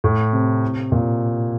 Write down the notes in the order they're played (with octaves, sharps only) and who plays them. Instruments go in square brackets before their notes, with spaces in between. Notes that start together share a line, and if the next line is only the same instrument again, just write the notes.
[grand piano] A2
C3
A#2